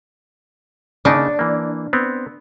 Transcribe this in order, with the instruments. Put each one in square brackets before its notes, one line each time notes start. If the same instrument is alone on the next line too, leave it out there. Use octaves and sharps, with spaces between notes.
[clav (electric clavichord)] C#3 A#3 D#4 [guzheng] D4
[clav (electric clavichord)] E3 A#3
B3 C4